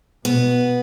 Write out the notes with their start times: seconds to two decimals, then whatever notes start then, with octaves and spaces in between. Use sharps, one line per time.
0.25 B2 B3